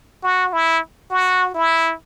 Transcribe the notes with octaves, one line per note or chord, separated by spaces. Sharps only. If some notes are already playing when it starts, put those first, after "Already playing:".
F#4
E4
F#4
E4